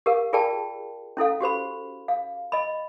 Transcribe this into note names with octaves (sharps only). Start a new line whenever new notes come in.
G4 A#4 F5
F4 G#4 A#4 D5 G5 A5
C#4 E4 A4 F5
F#4 G4 C5 B5
F5
D#5 B5